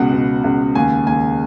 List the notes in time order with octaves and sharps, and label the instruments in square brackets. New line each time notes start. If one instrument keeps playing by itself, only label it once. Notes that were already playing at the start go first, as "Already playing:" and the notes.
Already playing: [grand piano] C#2 B2 F#5
B2
C#2
D#2 G#5
D#2 G#5